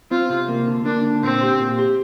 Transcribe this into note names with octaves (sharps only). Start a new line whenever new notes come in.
C4 F4
C3
A#3
D3
A#3 D4
D3
A#2 C4
G4
A#2
G4